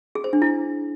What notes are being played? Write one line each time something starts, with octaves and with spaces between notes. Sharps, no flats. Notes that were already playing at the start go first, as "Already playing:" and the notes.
G#4
C5
D4
E4